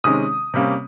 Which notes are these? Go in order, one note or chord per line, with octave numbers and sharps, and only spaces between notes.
C3 D#3 G#3 C#4 D#6
C3 G3 A#3 C#4